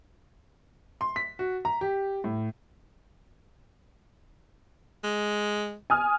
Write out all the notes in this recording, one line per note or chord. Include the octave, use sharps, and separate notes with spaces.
C6
B6
F#4
A#5
G4
A2
G#3
G#5 D#6 F6